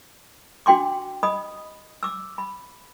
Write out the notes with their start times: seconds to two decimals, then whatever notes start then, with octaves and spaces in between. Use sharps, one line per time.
0.66 D4 F#4 G5 C6 D6
1.23 D#5 B5 D#6
2.03 D6 E6
2.38 B5